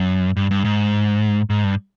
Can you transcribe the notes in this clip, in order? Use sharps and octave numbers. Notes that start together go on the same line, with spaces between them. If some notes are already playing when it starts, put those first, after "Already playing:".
Already playing: F#2
G2
G2
G#2
G#2
G2